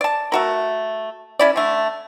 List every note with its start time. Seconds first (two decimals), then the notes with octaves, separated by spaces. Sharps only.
0.01 D5 A5
0.32 A3 F#4 A#4
1.39 C#4 E4 D5
1.56 D3 A3